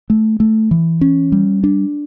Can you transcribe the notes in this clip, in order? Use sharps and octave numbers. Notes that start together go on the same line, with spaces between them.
A3
A3
E3
C#4
G3
D4